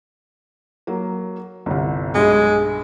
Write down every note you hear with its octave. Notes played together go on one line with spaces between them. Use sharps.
F#3 A#3
G1 C2
B1 G2 G#3